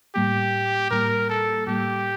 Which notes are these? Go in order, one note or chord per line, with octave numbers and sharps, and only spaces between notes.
A2 G3 A#3 G4
A2 G3 A#3 A#4
A4
A2 G3 A#3 G4